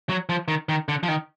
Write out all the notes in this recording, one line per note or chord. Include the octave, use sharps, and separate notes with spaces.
F#3
F3
D#3
D#3
D3
F3
D#3